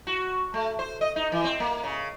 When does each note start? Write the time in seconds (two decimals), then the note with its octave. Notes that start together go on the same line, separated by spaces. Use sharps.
0.07 F#4
0.54 A3
0.79 C5
1.01 D#5
1.16 D#4
1.32 E3
1.44 C4
1.60 A#3
1.83 C#3